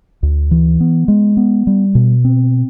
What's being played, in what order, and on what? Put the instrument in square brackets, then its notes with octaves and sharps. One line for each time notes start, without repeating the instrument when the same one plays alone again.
[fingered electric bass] D2
E3
B3
G#3
B3
G3
B2
C4